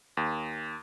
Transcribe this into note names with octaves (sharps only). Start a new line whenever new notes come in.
D#2